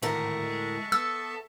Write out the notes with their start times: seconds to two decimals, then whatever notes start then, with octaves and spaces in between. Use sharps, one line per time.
0.02 D2 A2 D#3 G#3 A#4 E5 A5 C#6
0.42 G#3
0.92 B3 A4 E6